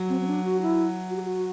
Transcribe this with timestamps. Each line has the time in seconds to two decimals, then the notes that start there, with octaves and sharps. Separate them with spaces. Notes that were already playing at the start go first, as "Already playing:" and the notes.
Already playing: F#3
0.09 C4
0.20 C4
0.27 D4
0.44 F#4
0.62 E4
1.10 F#4
1.17 G4
1.24 F#4